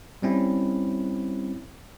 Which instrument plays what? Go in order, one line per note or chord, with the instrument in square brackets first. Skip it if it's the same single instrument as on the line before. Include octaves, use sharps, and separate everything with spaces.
[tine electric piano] G3 C4 C#4 E4